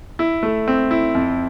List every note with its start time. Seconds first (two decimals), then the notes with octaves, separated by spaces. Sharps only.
0.19 E4
0.43 A3
0.68 C4
0.91 E4
1.15 F2